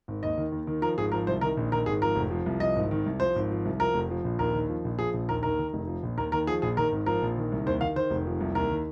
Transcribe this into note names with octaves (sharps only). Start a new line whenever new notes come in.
G#1
D#2 D#5
D#3
D#2
D#3
F3 A#4
G#1 G#4
F3 A#4
C2 C5
D#3 A#4
A#1
D#3 A#4
G#1 G#4
F3 A#4
F1
F3
C2
F3 D#5
G#1
D#3
C2
F3 C5
G#1
F3
C2
F3 A#4
F1
F3
A#1
D#2 A#4
D#3
F3
A#1
F3 G#4
A#1
D#2 A#4
D#3 A#4
D#3
F1
F3
A#1
D#2 A#4
D#3 A#4
F3 G#4
A#1 G#4
D#3 A#4
G#1
F3 A#4
A#1
D#3
C2
D#2 C5
D#3 F5
D#3 C5
F1
F3
C2
D#2 A#4
D#3